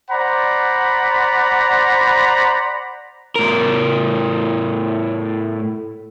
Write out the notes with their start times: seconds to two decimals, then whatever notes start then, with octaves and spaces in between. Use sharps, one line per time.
0.11 C5 D5 F#5 A#5 B5
3.36 A2 A#4